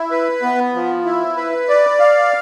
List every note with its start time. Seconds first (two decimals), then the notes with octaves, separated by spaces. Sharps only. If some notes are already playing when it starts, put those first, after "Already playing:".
Already playing: E4
0.11 B4
0.43 B3
0.74 F3
1.05 E4
1.37 B4
1.69 D5
2.00 F5